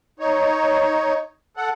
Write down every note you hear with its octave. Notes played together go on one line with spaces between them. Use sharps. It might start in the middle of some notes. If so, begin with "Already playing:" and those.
D#4 C#5
A4 F#5